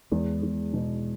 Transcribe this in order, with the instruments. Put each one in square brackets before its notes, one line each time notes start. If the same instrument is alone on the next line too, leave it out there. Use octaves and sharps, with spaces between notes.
[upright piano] E2 [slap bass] G#3
[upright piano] E2
B2